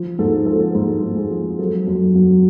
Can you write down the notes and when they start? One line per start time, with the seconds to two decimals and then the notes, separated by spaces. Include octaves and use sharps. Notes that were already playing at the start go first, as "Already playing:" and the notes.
Already playing: F3
0.19 G#2 A4
0.46 F3 A4
0.75 G#2
1.03 G#2
1.17 G#4
1.31 F3
1.59 F#3 A4
1.87 F#2
2.15 F#3